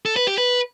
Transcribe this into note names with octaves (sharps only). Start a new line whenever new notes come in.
A4
B4
G4
B4